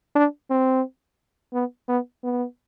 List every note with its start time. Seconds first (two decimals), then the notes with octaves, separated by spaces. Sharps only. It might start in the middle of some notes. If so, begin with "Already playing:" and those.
0.16 D4
0.51 C4
1.53 B3
1.88 B3
2.24 B3